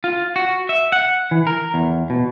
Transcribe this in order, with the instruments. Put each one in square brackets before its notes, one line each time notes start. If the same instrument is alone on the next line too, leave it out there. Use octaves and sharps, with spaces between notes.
[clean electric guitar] F4
F#4
E5
F#5
E3
A#4
E2
B2